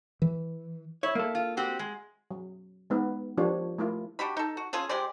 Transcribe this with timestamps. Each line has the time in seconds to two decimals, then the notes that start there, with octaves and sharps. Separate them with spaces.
0.22 E3
1.03 E4 C#5
1.15 A#3 A4
1.35 F4
1.57 C4 F#4 G4
1.79 G#3
2.31 F#3
2.90 G#3 B3 D#4
3.38 F3 A#3 D4 F4 G4 C#5
3.78 A3 A#3 E4 F4
4.19 D4 F#4 G4 B5
4.37 D#4 A4
4.57 F#4
4.73 C#4 F4 G#4 A4
4.89 G#3 G4 C5 D5